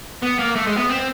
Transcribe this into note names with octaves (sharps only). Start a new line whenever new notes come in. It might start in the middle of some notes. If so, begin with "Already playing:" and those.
B3
A#3
A3
G#3
B3
C4